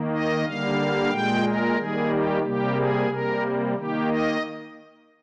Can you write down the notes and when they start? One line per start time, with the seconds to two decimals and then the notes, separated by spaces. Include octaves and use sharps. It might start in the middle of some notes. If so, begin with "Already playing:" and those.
Already playing: D#3 A#3
0.11 D#5
0.44 D3 G3 A#3 F5
1.10 A#2 G#3 G5
1.44 A#4
1.76 D#3 G3 A#3 G#4
2.09 G4
2.43 C3 G3 A#3 G4
2.75 G#4
3.08 C3 G3 A#3 A#4
3.75 D#3 A#3 G4
4.08 D#5